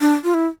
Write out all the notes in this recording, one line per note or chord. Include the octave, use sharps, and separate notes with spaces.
D4
F4
E4